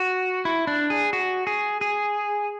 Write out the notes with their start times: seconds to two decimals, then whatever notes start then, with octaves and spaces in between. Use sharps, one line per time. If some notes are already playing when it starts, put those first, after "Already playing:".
Already playing: F#4
0.45 E4
0.67 D4
0.90 G#4
1.13 F#4
1.47 G#4
1.81 G#4